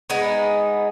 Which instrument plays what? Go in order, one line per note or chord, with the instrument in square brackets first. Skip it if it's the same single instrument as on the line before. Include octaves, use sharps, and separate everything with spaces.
[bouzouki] G#3 B3 D#4